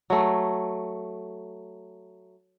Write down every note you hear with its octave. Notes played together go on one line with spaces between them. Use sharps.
F#3 A3